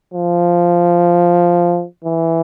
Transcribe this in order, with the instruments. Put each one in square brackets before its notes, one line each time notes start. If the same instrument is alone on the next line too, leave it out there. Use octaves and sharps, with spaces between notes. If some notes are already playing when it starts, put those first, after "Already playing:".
[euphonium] F3
E3